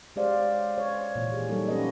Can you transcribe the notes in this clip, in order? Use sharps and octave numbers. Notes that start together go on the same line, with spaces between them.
G#3 F#4 G4 C5 D5 F5
C#5
A#2 E3
G4 G#4
F#3 G3 A#3 D#4 A4 A#4
C#4 F#4 G4 B4 D#5